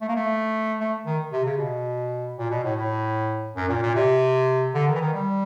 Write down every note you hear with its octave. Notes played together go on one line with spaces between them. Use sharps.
A3
A#3
A3
A3
D#3
C3
C#3
B2
A#2
B2
A2
A2
F#2
A#2
A#2
C3
D3
D#3
E3
D#3
G3